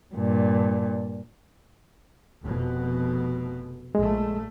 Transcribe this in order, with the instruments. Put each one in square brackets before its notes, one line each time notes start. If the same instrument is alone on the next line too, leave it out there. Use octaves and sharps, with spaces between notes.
[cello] G2 A#2
[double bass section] F1 B2
[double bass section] A#1 A3 [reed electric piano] G#3